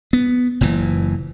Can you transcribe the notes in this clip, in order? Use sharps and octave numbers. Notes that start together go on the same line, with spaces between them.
B3
F#1 A#2 E3